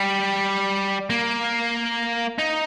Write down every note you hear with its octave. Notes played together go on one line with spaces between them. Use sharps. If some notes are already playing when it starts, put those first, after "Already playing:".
Already playing: G3
A#3
D#4